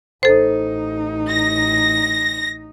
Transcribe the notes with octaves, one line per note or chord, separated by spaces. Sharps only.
A1 D#4 A4 C5
A#6